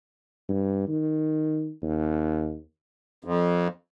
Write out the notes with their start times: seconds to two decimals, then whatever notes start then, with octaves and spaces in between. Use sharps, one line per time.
0.49 G2
0.88 D#3
1.83 D#2
3.24 F2